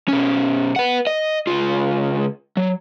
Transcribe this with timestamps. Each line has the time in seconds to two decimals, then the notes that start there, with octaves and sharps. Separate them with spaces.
0.08 B2 C#4
0.76 B4 F#5
1.07 D#5
1.47 C#2 F4
2.57 F#3